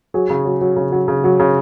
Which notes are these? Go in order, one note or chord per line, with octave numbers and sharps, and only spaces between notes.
F#3 G#4
C#3
F#3
F#3
C#3
F#3
C#3
F#3
C#3